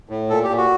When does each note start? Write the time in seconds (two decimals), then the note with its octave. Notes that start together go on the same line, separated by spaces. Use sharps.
0.09 A2
0.30 A#2 A4
0.44 G4
0.49 A#2
0.57 F#4